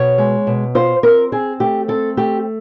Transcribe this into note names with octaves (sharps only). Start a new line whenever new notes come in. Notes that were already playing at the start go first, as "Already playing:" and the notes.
Already playing: B2 C#5
G#3
B2
F4 C5
C4 A#4
C4 G#4
A3 G4
C4 A4
A3 G4